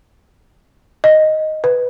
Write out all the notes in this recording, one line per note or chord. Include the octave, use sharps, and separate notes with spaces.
D#5
B4